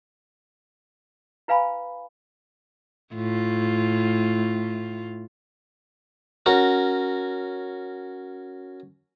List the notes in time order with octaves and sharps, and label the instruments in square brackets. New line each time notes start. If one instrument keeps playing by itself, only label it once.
[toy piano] E4 B4 F5 G#5 B5
[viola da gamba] A2 F4
[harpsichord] C#4 F#4 A#4